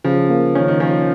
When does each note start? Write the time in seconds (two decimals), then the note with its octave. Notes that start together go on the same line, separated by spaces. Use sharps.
0.04 C#3 F3
0.30 A#3
0.55 D#3 C#4
0.68 D#3
0.80 F3 C#4